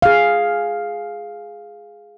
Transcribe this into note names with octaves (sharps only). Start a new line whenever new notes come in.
G#4 F5